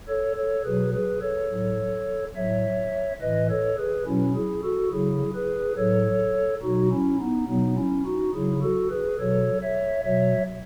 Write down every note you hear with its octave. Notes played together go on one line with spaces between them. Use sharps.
A4 C#5
A4 C#5
B2 F#3 G#4 B4
G#4 B4
A4 C#5
A2 F#3
A2 F#3 C#5 E5
A2 E3 B4 D#5
A4 C#5
G#4 B4
B2 F#3 C#4 E4
E4 G#4
F#4 A4
C#3 F#3 E4 G#4
G#4 B4
A2 F#3 A4 C#5
B2 F#3 D#4 F#4
C#4 E4
B3 D#4
B2 F#3 B3 D#4
C#4 E4
D#4 F#4
C#3 F#3 E4 G#4
F#4 A4
G#4 B4
B2 F#3 A4 C#5
C#5 E5
B2 F#3 C#5 E5